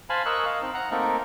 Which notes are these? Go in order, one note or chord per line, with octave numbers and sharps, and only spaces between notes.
C5 F5 G#5 A5 B5
A#4 D#5 C#6 E6 F#6
D#5 F5
C4 D#4
F#5 A#5
A3 A#3 C4 D#4 A4 A#4